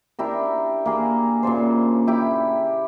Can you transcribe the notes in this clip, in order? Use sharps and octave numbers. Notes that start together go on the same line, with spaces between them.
D4 E4 G4 A#4
A#3 G#4 A#4
A#2 C#3 D4 C5
E4 G4 B5